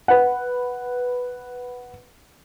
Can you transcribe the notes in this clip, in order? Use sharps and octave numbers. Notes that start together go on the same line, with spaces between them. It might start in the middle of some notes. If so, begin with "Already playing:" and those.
B4 F#5